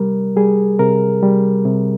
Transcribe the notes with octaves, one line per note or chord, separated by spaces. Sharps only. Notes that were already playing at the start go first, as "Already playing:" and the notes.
Already playing: C3 G3 A#4
G3 G#4
C3 A#4
G3
C3